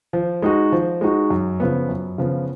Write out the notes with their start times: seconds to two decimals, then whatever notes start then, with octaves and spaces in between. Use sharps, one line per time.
0.13 F3
0.42 G#3 D#4 F#4
0.72 F3
1.01 G#3 D#4 F#4
1.30 F#2
1.60 C#3 F3 B3
1.89 F#2
2.18 C#3 F3 B3